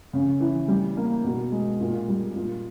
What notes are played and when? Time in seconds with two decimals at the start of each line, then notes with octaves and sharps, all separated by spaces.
0.13 C#3
0.40 E3
0.68 G3
0.97 A#3
1.24 B2
1.52 G#3
1.81 A#2
2.08 G3
2.35 A#2